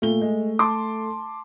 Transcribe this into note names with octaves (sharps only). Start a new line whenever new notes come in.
A#2 A3 G7
G#3
A5 C6 D6